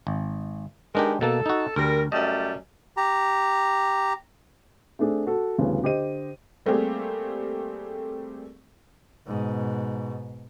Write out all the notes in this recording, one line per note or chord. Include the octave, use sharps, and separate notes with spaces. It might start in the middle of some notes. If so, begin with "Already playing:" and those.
G#1
D#3 G#3 B3 D4 G4 A#4
B2 A#3 A4 A5
D#4 F#4
D2 G3 A#4
F#2 G3 A3 D#5
G4 A#5
A3 C4 D4 G#4 A4
F#4 A4
D2 G2 C#3 E3 B3 C#4
D3 G4 C5 D#5 D#7
G3 A3 A#3 C4 G4 G#4
G#2 B2